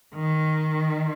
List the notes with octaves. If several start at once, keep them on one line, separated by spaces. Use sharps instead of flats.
D#3